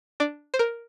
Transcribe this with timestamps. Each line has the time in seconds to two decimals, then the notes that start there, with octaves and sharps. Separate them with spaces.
0.20 D4 D5
0.54 C5
0.59 A#4